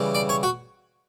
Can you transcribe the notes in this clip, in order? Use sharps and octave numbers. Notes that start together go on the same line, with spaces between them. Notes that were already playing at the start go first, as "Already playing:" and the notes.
Already playing: C#3 E3 G3
D5
C#5
F#4